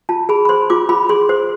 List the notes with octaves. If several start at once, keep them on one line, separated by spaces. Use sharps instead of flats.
F4 A5
G#4 B5
B5
C5 C6
F4 D6
F4 B5
G#4 C6
C5